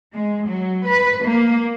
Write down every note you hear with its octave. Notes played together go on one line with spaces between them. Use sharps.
G#3
F#3
B4
A#3